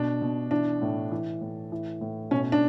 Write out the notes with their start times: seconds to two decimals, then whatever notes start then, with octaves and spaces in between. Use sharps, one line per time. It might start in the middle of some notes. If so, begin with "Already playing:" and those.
Already playing: B2 D4
0.22 B2
0.51 E3 D4
0.82 A2
1.11 E3
1.41 A2
1.72 E3
2.01 A2
2.31 B2 C#4
2.52 D4